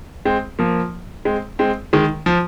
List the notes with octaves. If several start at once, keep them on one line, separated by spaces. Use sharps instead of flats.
G#3 C4
F3 A#3
G#3 C4
G#3 C4
D#3 G#3
F3